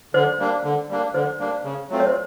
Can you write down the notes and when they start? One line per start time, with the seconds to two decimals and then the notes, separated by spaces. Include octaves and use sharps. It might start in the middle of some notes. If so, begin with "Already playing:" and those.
0.14 D3 C5
0.39 G3 A#3 D4
0.64 D3
0.89 G3 A#3 D4
1.14 D3 C5
1.39 G3 A#3 D4
1.64 C#3
1.89 F#3 A3 C4 F4
2.00 C#5
2.07 C5